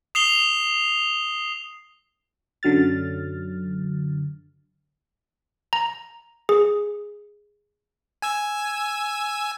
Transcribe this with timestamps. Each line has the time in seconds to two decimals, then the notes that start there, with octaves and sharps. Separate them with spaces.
0.15 D#6 C7 F7 G7
2.63 F#2 D3 F#3 F6 A6
5.73 A#5
6.49 G#4
8.22 G#5 E6 G#6